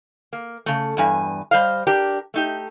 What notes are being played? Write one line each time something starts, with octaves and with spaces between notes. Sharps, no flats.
A#3
C#3 A3
E2 G2 G#5
G3 C5 D#5 F5
D4 G4 A#4
A3 D#4 G4